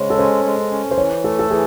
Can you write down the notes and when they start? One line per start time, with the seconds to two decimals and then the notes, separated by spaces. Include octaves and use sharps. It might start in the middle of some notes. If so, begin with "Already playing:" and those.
Already playing: C#3 G#3 C5 C#5
0.10 A4
0.18 C#4 C5
0.45 G#3
0.72 C#4
0.91 C5
0.98 E3 C#5
1.24 A3 A4
1.39 A4
1.50 E3 G#4